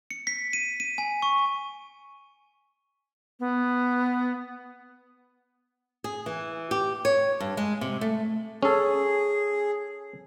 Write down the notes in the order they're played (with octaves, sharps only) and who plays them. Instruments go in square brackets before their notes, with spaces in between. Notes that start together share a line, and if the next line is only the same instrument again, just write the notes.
[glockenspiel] C#7
B6
D#7
D#7
G#5
C#6
[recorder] B3
[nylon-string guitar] G#4
E3
G4
C#5
G2
G#3
C3
A3
[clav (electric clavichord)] C#4 A4 [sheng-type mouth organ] G#4